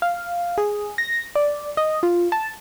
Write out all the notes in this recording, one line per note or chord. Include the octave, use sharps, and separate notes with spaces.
F5
G#4
A#6
D5
D#5
F4
A5